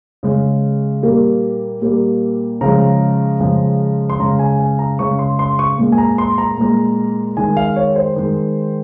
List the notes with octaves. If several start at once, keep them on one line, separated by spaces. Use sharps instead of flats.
C#3 G#3
A#2 G3 A#3
A#2 G3 A#3
C#3 F3 G#3 A#5
C#3 F3 G#3
C6
C#3 G#3 A#5
G#5
G#5
A#5
C#3 G#3 C#6
C6
C6
C#6
A#2 G#3
G#5
A#5
C6
A#5
A#2 G#3
D#3 G#3 G#5
F5
C#5
C5
D#3 G#3